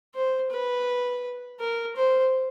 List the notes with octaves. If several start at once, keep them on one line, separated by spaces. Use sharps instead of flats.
C5
B4
A#4
C5